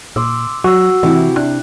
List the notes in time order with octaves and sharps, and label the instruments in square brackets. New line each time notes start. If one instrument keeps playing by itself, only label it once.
[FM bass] A#2 [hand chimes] C6 D6 E6
[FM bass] F#3 [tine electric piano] F#4 [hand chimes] F#5 E6
[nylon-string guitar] C3 E4 [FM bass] E3
[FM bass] D4 [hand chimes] F#6